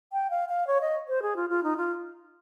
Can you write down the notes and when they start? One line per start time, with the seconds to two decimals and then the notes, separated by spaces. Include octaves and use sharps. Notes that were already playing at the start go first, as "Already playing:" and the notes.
0.13 G5
0.30 F5
0.49 F5
0.67 C#5
0.81 D#5
1.08 C5
1.22 G#4
1.36 F4
1.50 F4
1.63 D#4
1.77 F4